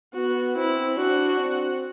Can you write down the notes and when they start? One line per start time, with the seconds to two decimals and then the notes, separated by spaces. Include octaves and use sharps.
0.14 B3 F#4
0.56 C4 E4
0.97 D4 F#4
1.40 C4